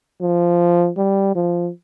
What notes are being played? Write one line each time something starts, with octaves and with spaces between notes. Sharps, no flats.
F3
G3
F3